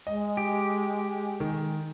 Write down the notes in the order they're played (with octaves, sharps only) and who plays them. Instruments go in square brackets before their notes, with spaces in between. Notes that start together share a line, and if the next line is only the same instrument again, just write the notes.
[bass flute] G#3 [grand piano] D#5
[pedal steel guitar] G4
[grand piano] D#3